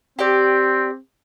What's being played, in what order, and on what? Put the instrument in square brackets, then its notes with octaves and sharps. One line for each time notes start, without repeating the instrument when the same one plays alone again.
[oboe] C4 [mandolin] G4 D5